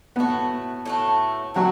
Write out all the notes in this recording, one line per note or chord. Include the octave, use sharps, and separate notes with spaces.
A2 A3 B3 F#4
A2 A3 F#4
A2 F#3 A3 F#4